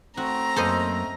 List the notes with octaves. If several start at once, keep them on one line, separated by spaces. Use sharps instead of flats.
A3 C4 F#4 A#5
F#2 A#3 A4 C5 D#5